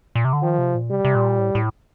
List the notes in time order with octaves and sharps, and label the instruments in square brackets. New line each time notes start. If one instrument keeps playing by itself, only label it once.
[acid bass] A#2
C3
D3
[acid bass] D#3 [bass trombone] F3
[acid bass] C3
A#2
[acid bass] C3 [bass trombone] G3
[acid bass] C3
A#2
A2
A2